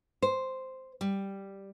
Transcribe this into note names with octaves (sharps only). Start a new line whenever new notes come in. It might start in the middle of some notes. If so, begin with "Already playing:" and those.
C5
G3